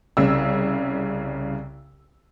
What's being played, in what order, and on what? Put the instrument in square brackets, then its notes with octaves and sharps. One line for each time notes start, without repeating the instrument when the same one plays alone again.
[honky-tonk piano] C2 C#3 E6